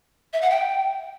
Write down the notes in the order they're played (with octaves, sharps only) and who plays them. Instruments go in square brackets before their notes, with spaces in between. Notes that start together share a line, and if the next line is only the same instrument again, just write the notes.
[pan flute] E5
F#5
G5